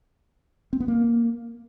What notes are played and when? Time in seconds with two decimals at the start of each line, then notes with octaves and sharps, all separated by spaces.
0.73 C4
0.80 B3
0.88 A#3